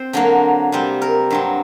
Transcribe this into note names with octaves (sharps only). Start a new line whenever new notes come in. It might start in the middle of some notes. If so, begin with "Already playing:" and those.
Already playing: C4 C5
D3 F#3 A#3
C3 G3 C4
A#4
G2 F#3 C4